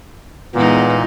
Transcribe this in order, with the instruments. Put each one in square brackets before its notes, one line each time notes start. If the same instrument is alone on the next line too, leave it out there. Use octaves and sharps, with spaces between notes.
[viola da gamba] E2 G#3 D#4 [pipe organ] A#2 [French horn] B3